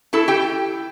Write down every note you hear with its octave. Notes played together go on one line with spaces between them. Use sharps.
E4 A4 A5
G4 G5